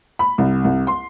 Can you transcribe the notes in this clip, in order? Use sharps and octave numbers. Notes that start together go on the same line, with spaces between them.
B5
C2
C2
C6